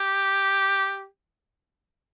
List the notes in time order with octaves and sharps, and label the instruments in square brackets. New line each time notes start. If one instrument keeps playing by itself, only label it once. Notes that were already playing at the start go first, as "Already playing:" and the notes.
Already playing: [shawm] G4